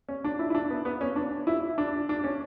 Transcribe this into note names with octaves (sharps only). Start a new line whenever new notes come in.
C#4
D4
E4
E4
D4
B3
B3
C#4
D4
E4
D4
D4
C#4